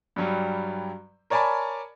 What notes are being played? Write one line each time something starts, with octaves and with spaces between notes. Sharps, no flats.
G2 F#3 G3
A#4 C#5 D5 G#5 A5 B5